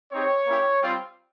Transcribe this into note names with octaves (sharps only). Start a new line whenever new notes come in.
C4 D#4 G4 C#5
A#3 C#4 E4 G4
G3 C4 F4